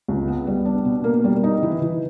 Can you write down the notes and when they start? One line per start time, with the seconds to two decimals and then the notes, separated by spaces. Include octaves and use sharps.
0.08 C#2
0.28 B3
0.47 G3
0.65 D4
0.85 B2
1.04 A#3
1.24 G3
1.44 D#4
1.63 E3
1.82 E3